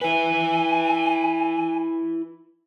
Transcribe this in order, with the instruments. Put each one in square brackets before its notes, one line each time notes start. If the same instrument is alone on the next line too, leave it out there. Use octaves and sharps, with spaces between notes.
[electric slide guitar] E4 B4 [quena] G#5